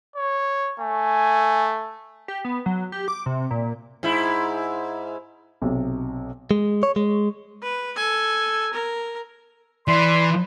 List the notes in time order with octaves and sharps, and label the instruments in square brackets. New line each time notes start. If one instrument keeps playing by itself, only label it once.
[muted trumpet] C#5
[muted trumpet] A3 [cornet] G#5
[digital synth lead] G4
B3
F#3
G4
D6
C3
A#2
[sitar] G#2 E4
[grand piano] B1 C3
[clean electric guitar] G#3
C#5
G#3
[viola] B4
A4 G#5
A#4
[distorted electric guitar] E3 [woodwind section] D5 B5 C6